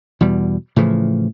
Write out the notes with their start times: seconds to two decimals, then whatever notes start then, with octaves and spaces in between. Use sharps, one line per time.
0.21 E2 B2 G3
0.76 A2 C#3 E3 F3